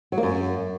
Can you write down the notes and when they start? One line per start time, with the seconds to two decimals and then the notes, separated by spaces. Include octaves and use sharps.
0.12 F#3
0.18 A#3
0.23 F#2